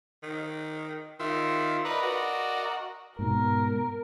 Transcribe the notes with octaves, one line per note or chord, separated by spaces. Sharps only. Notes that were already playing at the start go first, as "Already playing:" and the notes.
D#3
D#3 F4 E5
A#4 B4 D5 D#5
F#4
G#2 B2 A#4